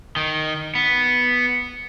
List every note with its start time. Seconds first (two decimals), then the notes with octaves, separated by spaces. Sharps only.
0.17 D#3
0.75 B3